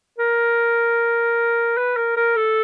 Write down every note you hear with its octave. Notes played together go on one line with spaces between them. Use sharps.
A#4
B4
A#4
A#4
A4